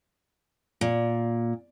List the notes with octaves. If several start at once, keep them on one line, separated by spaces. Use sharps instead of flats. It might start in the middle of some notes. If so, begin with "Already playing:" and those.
A#2